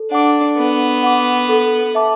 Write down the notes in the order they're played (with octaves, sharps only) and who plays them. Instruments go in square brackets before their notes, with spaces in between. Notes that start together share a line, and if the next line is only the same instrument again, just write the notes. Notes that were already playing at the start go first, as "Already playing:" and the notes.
Already playing: [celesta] A4
[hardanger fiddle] D4 [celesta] F#5 D6
[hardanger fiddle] B3 [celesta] A4
[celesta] F#5 D6
A4
E5 A5 D6